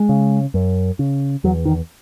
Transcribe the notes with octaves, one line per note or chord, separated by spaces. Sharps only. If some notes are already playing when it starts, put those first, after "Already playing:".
Already playing: G#3
C#3
F#2
C#3
E2 F#3
D#3